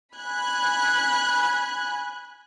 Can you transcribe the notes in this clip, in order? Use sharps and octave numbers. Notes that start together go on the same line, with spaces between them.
G#5 B5 F#6 G#6